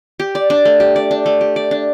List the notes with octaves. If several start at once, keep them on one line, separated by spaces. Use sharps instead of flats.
G4
D5
D4
A3
G4
D5
D4
A3
G4
D5
D4